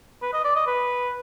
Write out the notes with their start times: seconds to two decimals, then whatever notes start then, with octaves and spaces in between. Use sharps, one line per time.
0.22 B4
0.33 D#5
0.44 D5
0.55 D#5
0.67 B4